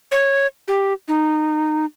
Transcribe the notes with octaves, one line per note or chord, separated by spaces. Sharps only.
C#5
G4
D#4